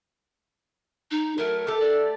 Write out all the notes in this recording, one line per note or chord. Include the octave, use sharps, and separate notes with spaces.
D#4
F#3 A3 A#4
A3 G4 A4
D5